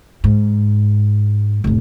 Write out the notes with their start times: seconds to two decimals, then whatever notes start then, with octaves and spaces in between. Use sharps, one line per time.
0.24 G#2
1.64 F1 A2